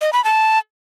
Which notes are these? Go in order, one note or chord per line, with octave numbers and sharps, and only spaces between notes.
D#5
B5
A5